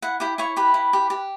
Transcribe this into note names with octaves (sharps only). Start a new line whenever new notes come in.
E4 F#5
E4 G4 G5
E4 C#5 C#6
G4 B4 B5
E4
G4
G4